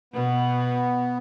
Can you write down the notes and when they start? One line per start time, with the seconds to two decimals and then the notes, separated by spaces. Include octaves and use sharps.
0.14 B2 B3